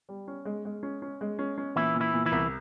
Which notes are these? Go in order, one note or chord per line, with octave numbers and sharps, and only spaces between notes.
G3
C#4
G#3
G#3
C#4
C#4
G#3
C#4
C#4
A#2 E3 E4
A#2
E3 E4
A#2
E3 E4
C2